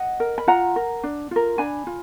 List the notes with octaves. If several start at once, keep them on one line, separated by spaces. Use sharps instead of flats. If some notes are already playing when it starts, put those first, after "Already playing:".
Already playing: D#5 F#5
A#4
B5
F4 F#5 A#5
A#4
D4
F4 A#4
D4 G#5 B5
F4